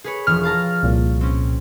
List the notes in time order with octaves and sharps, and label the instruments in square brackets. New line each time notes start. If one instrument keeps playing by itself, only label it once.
[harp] G#4 B4 C#5
[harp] E1 F3 [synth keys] F6
[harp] F5 A5 A#5
[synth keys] C2 A#2
[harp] C4 C#4